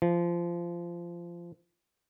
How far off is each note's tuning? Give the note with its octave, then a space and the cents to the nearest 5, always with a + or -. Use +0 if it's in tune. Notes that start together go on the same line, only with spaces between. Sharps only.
F3 -20